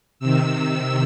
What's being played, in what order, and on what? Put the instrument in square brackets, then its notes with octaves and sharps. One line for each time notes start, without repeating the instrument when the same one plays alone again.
[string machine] C3 D#3 E6